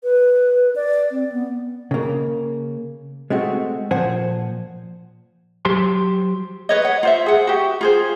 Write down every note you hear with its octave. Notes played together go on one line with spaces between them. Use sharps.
B4
D5
C4
B3
C#3 A#3
G#3 A3 C4 F#4
A#2 F3 C5 F#5 G#5
F#3 G4 C5 C6
B4 C#5 D#5
F#5
F4 C5 E5
G#4 F#5
F#4 G4
F4 G#4 C5